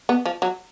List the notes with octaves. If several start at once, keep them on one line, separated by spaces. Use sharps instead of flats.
B3
F3
F#3